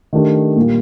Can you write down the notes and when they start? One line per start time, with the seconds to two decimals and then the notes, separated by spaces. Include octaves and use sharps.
0.13 D#3 A3 D4 G4
0.56 A#2 G3 A#3